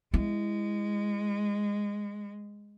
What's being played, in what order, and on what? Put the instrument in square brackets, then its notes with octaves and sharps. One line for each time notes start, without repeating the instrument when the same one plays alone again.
[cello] G#3 [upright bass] E4